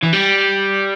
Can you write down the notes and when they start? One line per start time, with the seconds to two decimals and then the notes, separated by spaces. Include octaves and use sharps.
0.03 E3
0.13 G3